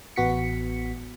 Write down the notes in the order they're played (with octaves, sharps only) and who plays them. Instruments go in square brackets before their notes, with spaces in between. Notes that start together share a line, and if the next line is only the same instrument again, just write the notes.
[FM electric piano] A1 B3 F#4 B6 C#7